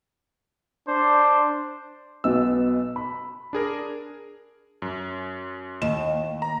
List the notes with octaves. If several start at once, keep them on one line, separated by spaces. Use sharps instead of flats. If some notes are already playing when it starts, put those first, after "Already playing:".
D4 C5
B1 B2 E6
B5
D4 G#4 A#4
F#2
D#2 E7
A#5